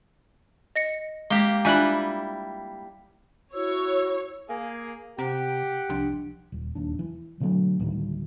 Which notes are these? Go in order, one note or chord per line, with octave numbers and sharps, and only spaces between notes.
D#5 A#6 C#7
G#3 A#3 G4 B6 G7
G3 D4 E4 F4 G#5 F#6 F#7
E4 F#4 C#5 E6
A#3 G#4 A#4 F5 G#5
C3 G4 F#5 A#5
C2 F3 D4
D#1
D#1 D#2 D4
E3
B2 D3 F#3 A3
D2 A2 D#3 G3